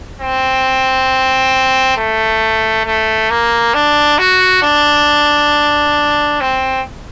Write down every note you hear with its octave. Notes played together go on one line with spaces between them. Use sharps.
C4
A3
A3
A#3
D4
F#4
D4
C4